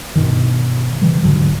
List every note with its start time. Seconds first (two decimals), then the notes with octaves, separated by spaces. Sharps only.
0.16 G2 B2 D#3
1.02 C#3 E3 G3
1.23 D#1 G#2 D3 F#3